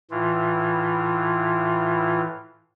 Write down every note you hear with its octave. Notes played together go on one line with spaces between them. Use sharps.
A2 E3 F4